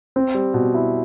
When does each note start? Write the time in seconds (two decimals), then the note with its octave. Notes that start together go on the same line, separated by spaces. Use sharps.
0.16 C4
0.34 G3
0.54 B2
0.74 E4